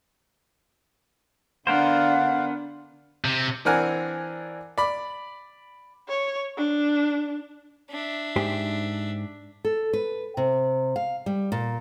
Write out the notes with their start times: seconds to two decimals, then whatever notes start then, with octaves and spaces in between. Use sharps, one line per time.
1.67 D3 B3 D4 A#4 C5 F5 F#5
3.25 C3
3.65 E3 C4 D4 A#4 F#5 G#5
4.78 D5 B5
6.09 C#5
6.57 D4
7.91 D4 E5
8.36 G#2 G4 C5
9.65 A4
9.93 B4
10.37 C3
10.96 F5
11.26 G3
11.52 A#2